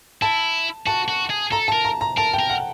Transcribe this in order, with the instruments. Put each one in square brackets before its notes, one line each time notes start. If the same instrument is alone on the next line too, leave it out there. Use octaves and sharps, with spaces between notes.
[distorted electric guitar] E4 [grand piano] A5
[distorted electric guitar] F#4 [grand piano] A5
[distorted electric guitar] F#4
G#4
[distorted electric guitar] A4 [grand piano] A#5
[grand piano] A5
[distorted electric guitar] A#4
[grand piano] A#5
A#5
[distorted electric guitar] A#4 [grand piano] A5
[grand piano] G5
[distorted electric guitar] A#4
[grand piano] F#5